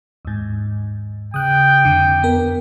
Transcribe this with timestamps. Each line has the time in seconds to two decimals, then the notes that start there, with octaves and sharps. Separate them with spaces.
0.25 D#2 G#2
1.34 C#3 G5 D#6 F#6
1.85 F2 D3
2.23 B3 A#4